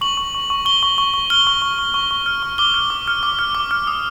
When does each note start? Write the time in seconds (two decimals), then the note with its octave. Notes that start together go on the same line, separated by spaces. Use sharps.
0.01 C#6 F#7
0.17 C#6
0.35 C#6
0.50 C#6
0.65 C#6 G7
0.83 C#6
0.98 C#6
1.14 C#6
1.30 F6 G7
1.47 C#6
1.62 C#6
1.79 C#6
1.94 C#6
2.11 C#6
2.26 F6
2.43 C#6
2.58 D6 G7
2.74 F6
2.90 D6
3.08 F6
3.23 D6
3.39 F6
3.55 D6
3.71 F6
3.87 D#6